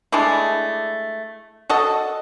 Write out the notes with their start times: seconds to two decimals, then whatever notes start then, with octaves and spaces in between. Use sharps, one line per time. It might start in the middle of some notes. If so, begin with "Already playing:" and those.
0.12 G#3 A3 D4 E4
1.70 F#4 A4 D#5